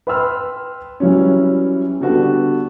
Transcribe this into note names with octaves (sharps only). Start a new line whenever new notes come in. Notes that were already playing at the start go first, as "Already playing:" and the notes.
B4 G5 B5 C6 E6 F6
E3 F#3 G3 C#4
D3 G3 B3 F#4 A4